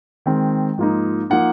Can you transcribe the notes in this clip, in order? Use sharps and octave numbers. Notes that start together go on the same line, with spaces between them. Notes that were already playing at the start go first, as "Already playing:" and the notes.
D#3 G#3 C4
G#2 F3 A#3 D#4
F3 A#3 D#4 F#5